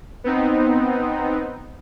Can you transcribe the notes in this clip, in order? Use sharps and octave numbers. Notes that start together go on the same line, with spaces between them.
B3 C4 D#4